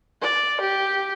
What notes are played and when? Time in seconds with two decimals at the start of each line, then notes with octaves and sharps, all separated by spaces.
0.22 D5
0.61 G4